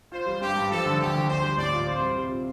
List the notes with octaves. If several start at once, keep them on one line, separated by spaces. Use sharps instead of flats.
F4 C5
G3
G2 G4
G2
F3 A4
D3
D2 G4
D2
D4 C5
G3
A2 D5
F4
C4 C5
G3
C3
F4